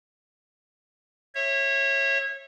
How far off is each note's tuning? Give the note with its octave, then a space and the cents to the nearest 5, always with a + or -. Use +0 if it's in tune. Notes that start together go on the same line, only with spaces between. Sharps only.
C#5 -25 E5 +0